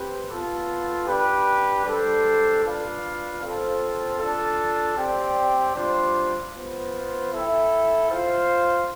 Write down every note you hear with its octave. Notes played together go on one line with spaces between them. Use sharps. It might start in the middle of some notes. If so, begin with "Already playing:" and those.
Already playing: C4 G4 B4
B3 F4 A4
D4 G4 B4
G3 D4 A4 C5
D4 F4 B4 F5
C4 F4 A4 C5
D4 F4 A4
C4 G4 D5 G5
G3 D4 F4 C5
B3 F4 C5
E4 A4 E5 G5
F4 C5 F5